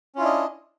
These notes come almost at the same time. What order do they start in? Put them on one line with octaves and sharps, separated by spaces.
C#4 F4 E4 D4 D#5